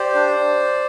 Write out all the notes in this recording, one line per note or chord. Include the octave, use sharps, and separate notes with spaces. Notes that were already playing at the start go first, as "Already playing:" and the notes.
Already playing: G4 C5 D5
D4